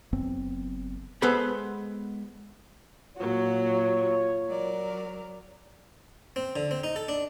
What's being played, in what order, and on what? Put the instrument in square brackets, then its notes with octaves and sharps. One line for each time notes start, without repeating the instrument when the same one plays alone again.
[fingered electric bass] F#1 F#2 B3 C4
[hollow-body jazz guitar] G#3 B3 A4 B4 C5 B5
[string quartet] A#2 F#3 F#4 [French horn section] F4 C#5
[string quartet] F#3 A#4 D5
[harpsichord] C4
D3
C4
D#4
A4
D4